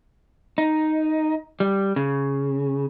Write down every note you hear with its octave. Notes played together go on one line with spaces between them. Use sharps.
D#4
G3
C#3